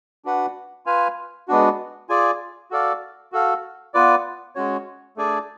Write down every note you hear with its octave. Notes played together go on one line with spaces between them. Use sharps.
D4 F#4 B4 F#5
F4 B4 F5 G#5
G#3 B3 D4 F#4
F4 G#4 D5 G#5
F#4 A4 D5 F5
F#4 A4 F5
B3 F4 B4 D5
G#3 C#4 F#4 C#5
A3 D4 G#4 D5 G#5